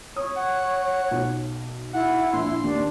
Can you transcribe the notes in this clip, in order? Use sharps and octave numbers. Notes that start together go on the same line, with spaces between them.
C#5 D#6
F#5
B1
E4 F#5
A#1 C6
D#2 D4